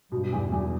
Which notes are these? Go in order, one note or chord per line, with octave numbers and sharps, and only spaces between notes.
G2 B2
E2
E2